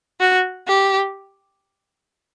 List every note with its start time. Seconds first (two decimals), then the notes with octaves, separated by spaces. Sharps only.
0.20 F#4
0.67 G4